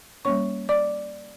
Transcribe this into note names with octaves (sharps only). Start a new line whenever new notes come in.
G3 A#3 C#4 C#5 C#6
D5 D6